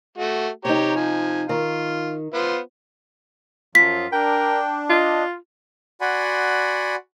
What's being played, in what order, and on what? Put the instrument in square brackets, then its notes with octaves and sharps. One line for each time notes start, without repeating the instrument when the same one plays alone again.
[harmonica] A3 F#4
[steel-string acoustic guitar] C3 D#4 [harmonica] G4 C#5 A#5
[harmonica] F3 G#5
[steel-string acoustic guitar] D#3 [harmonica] F4
[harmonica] B3 F4 C5
[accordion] F#2 F3 F#3 [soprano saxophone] F4 [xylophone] B6
[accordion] D4 [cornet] A#4 [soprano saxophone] G5
[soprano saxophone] F4 [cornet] D#5
[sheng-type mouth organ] F#4 D5 F#5 G#5 B5 C6